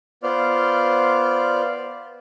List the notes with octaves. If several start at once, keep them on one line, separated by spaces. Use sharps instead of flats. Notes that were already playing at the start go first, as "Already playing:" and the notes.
B3 F4 C5 D5 F6